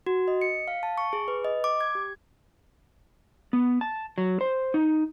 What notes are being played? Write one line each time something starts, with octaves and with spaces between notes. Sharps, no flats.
F#4
D#5
C#7
F5
A5
C#6
G#4
B4
D#5
D6
G#6
G4
B3
A5
F#3
C5
D#4